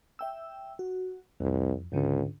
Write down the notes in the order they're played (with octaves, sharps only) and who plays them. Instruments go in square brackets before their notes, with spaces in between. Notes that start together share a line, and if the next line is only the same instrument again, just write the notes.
[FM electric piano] E5 G5 E6
F#4
[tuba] C2 [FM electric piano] F2
[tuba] C#2 [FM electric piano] G#2 D3